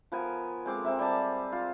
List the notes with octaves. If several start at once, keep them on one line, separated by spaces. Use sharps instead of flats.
F3 B3 A#4 G#5
G#3 C4 D6
C4 A#4 E5
G3 G#5 A5
F4